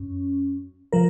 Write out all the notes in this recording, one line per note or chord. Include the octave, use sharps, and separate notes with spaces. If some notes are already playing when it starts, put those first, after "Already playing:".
Already playing: F#2 C#4
F3 A#4